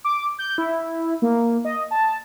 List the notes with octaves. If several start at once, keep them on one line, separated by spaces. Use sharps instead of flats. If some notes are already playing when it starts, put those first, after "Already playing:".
D6
G6
E4
A#3
D#5
A5